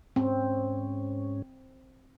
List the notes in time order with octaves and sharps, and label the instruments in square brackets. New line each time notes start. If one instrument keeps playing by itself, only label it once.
[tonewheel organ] G#2 C#4 [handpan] C4